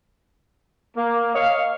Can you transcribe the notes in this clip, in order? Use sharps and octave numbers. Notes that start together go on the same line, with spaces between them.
A#3
C#5 D#5 F5